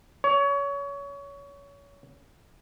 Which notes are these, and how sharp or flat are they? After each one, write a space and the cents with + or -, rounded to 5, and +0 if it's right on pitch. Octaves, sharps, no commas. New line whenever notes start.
C#5 +25